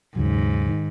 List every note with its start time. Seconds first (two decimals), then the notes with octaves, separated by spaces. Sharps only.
0.16 D#2 G#2 C#3 F#3
0.69 D#3